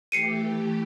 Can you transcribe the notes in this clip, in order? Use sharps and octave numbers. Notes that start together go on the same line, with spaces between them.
E3 A3 G4 C7 C#7 D#7